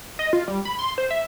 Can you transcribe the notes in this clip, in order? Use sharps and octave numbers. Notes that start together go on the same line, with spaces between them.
D#5
F4
G3
B5
C6
C5
E5